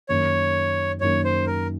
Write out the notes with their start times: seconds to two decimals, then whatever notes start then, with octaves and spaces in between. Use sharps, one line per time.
0.09 F#2 D#3 A#3 D#4 C#5
1.01 F#2 D#3 A#3 D#4 C#5
1.25 C5
1.47 A#4